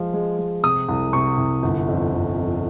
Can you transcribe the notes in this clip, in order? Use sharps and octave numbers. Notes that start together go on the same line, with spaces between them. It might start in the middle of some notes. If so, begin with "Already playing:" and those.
Already playing: F3 G#3
G#3
G#3
C3 D#6
C2
C3 C#6
C2
G1
F2
G1
F2